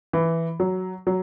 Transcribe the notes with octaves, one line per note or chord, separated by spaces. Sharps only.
E3
F#3
F#3